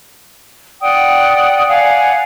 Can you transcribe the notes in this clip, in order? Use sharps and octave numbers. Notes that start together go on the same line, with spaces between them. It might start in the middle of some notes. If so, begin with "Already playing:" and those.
D5 F#5 G5 D#6
D5 F5 F#5 G#5